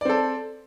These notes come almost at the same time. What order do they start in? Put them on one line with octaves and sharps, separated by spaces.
D5 C4 A4